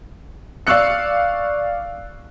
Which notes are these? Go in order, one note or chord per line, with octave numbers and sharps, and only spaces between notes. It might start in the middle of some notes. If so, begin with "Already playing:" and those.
D5 F5 C#6 E6 F#6 C#7